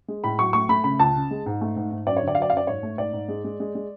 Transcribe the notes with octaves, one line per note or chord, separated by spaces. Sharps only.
G#3
A2 B5
F#3 C#6
A3 C#6
A3 B5
C#3 B5
C#2 A5
C#3
G#3
G#2
A3
G#2
G#2
F#2 D5
C#5
D3
D5
F#3 F5
D5
F5
F#2 D5
G#2 C#5
A3
G#2 D5
G#2
G#3
G#3
G#3
G#3